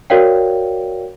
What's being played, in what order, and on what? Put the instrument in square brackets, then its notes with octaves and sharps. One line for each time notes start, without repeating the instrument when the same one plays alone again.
[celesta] F#4 A#4 C#5 D5 F5 G5